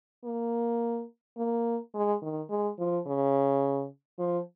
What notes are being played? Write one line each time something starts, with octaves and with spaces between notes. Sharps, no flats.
A#3
A#3
G#3
D#3
G#3
F3
C#3
F3